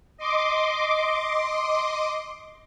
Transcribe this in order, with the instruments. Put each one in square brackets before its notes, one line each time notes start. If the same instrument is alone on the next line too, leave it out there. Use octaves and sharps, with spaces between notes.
[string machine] D#5 C6 D6